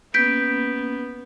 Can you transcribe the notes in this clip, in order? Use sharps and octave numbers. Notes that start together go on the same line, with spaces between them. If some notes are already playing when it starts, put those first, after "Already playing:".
A#3 B3 C#4 G6 B6 D7